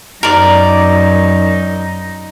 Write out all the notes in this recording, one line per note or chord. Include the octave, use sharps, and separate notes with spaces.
F#2 D#4 A#4 D5